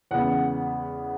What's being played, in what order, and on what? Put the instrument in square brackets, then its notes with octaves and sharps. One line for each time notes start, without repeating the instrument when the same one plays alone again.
[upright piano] E2 C#3 G#3 B3 F#5